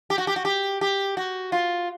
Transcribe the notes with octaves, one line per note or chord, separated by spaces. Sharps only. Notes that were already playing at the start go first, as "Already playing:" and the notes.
G4
F#4
G4
F#4
G4
G4
F#4
F4